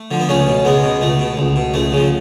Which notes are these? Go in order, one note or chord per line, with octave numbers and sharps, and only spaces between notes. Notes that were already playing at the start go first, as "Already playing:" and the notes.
Already playing: A3
D3 F3
B3
C#2 A3 C#4
B2
C#2 G#3 B3
B2
C#2 A3
B2
C#2
B2
C#2 A3
C#3 F3